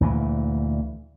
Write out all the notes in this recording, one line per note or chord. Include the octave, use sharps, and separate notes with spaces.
D2 A#2 E3